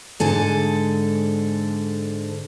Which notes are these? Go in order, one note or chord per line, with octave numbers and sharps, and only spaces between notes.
G#2 D3 A4 G#5